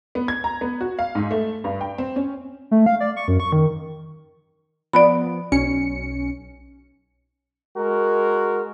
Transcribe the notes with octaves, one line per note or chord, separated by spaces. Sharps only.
B3
G#6
A#5
B3
F#4
F5
G#2
A3
G2
G5
C4
C#4
A3
F5
D5
C#6
F#2
C#6
D#3
F3 B3 D5 B5
B1 C#4 C#7
G#3 F#4 A#4